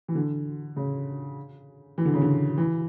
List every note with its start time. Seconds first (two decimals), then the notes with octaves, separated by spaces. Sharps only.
0.08 E3
0.15 D3
0.76 C#3
1.98 E3
2.05 D3
2.14 C#3
2.22 D3
2.58 E3